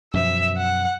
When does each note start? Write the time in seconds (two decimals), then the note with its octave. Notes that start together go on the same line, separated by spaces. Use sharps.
0.14 F#2 B2 F3 E5
0.58 F#5